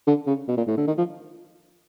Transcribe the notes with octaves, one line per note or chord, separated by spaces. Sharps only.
D3
C#3
B2
A#2
A2
D3
D#3
F3